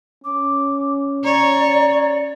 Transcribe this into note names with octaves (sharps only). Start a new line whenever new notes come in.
C#4 D6
C#5 D5 A#5